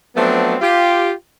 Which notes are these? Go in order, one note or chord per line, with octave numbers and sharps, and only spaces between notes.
F3 F#3 A3 B3 C4 D4
F4 G4